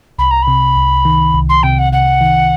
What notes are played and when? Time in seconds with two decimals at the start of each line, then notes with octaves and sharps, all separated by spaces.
0.18 C2 B5
0.30 A#5
0.42 B5
0.47 C3
0.77 C2
1.05 D#3
1.34 C2
1.49 C6
1.62 C3 G5
1.78 F#5
1.92 C2 F#5
2.21 D#3